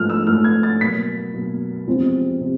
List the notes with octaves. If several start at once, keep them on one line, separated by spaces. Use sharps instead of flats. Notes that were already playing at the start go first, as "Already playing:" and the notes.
Already playing: G#2 F3 A3 F6
E6
G#2 F3 A3 F6
G#6
A6
B2 F#3 A#3 B6
B2 F#3 A#3
E2 C3 F3 G#3 C4
C3